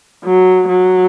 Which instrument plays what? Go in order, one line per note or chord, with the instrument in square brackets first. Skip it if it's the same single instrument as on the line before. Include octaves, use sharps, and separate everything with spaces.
[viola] F#3
F#3